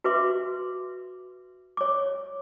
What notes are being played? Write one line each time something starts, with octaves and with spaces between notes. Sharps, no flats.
F#4 B4 E5 C6 D6
C#5 D6